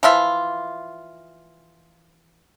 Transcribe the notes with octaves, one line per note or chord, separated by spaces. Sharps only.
E3 F3 F4 E5